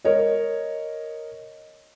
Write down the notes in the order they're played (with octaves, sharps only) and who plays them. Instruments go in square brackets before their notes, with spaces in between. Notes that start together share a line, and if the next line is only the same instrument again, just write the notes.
[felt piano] A#4 C#5 D#5